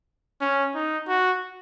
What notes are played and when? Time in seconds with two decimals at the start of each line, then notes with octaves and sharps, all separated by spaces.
0.41 C#4
0.75 D#4
1.08 F#4